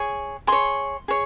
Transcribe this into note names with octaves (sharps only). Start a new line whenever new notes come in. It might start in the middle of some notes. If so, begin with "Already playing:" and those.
Already playing: G#4 C#5
G#4 C#5 C6
G#4 C#5